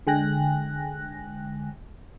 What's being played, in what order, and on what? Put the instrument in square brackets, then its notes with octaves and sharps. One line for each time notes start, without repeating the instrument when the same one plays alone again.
[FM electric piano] D3 G#3 G5 G#5 F#6 A#6